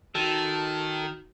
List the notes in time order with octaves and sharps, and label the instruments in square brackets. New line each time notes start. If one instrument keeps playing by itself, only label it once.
[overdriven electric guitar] D#3 [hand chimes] D#4 F#4 [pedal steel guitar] A4